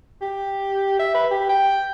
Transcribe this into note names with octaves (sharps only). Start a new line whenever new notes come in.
G4
E5
B4
G4
G5